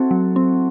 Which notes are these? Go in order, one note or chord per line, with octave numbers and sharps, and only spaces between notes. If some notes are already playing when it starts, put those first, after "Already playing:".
Already playing: C4 E4 F#4 A4
F#3
C4